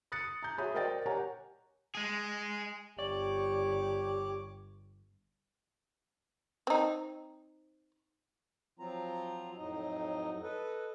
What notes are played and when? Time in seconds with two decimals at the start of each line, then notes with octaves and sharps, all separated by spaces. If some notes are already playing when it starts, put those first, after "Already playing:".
0.12 D#6 F#6 A6 C#7
0.42 A#5 G6
0.58 F#4 G#4 C#5 E5 B5 D#6
0.74 A#4 C5 D5 D#5 G5 A6
1.06 G4 A#4 C#5 F#5 G#5 A#5
1.95 G#3 G#4
2.99 G1 G4 C#5 D5 D6
6.67 C4 D#4
8.79 F3 F#3 C4 F4 A#5
9.57 F2 A2 F#3 D#4 D#5
10.43 A4 B4 D#5